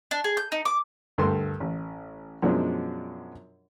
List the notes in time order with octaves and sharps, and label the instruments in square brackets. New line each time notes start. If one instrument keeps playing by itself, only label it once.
[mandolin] D4
G#4
G6
D#4
D6
[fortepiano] D2 G2 A4 A#4 C6
A1
F#2 B2 F3 G#3 D4 F4